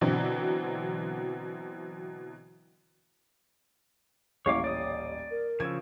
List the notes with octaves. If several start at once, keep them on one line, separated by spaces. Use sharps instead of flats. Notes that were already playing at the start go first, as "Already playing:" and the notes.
B2 D3 E3 F#3 C4
D#1 A1 E4 C#5 F5 D6
C#5 D5 D#6
A#4
C#3 F3 E6 G#6